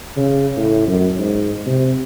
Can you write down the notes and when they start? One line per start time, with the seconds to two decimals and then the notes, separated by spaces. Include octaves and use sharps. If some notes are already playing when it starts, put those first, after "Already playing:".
0.17 C#3
0.57 A2
0.87 F#2
1.19 G#2
1.66 C3